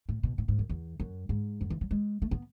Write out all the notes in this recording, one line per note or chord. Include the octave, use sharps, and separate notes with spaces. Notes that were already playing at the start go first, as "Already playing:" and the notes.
A2
B2
A2
G#2
F#2
E2
F#2
G#2
F#2
E3
F#3
G#3
A3
B3